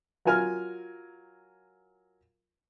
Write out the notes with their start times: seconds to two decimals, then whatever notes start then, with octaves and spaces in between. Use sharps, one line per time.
0.25 F#3 F4 A#4 G#5 F6